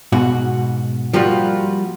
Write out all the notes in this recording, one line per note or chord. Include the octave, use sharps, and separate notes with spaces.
G#2 B2 F#4
F3 G3 A#3 F4 F#4